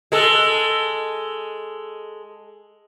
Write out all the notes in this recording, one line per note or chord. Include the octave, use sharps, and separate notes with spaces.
G#3 A4